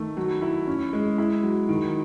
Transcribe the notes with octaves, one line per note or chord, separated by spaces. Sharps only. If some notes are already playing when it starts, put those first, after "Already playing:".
Already playing: D#3 A3
F#3
E4
C#4
G#3
E4
F#3
D#3